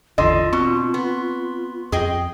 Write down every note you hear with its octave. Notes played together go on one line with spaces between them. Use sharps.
G#1 E2 D3 F4 D#5 C6
B2 C4 C#6
B3
F2 G#4 D#5 G5